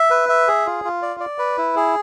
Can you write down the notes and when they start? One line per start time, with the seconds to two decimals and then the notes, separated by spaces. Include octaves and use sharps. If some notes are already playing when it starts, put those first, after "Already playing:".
Already playing: E5
0.11 B4
0.29 E5
0.48 G#4
0.66 F4
0.85 F4
1.02 D5
1.20 D5
1.39 B4
1.58 E4
1.76 G#4